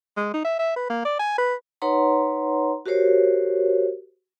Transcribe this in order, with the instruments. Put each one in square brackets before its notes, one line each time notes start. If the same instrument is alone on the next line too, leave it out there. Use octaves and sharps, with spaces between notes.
[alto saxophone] G#3
D#4
E5
E5
B4
A#3
D5
G#5
B4
[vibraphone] D#4 B4 C#5 F#5 A#5 C6
F#4 G4 A#4 C5 C#5